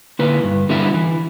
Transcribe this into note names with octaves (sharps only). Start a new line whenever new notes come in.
D3 A#3 E4 B4
G2
D3 G3 B3 E4
E3